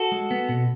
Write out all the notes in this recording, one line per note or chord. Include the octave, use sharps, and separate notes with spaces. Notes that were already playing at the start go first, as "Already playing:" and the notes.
Already playing: F#4 A4
G#3
B3
B2